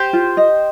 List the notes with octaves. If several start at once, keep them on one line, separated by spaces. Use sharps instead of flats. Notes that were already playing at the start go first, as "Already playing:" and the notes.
Already playing: G4 C5
F4
D#5